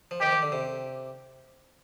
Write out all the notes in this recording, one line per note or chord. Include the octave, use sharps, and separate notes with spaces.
F3
D#3 G4
F3
D#3
D3
C3